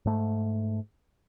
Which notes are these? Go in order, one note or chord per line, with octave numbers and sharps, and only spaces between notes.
G#2 A3